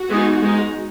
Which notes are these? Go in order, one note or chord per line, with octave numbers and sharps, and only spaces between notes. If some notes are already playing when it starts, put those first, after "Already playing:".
Already playing: F#4
E3 G#3 B3 D#4
G#3 D#4